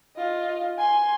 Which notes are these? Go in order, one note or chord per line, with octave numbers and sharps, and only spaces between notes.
F4 D#5
G#5 C6